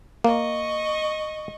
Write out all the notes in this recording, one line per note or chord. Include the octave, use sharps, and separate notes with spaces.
A#3 D#5 C#6